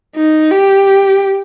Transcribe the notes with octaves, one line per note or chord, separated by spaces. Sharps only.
D#4
G4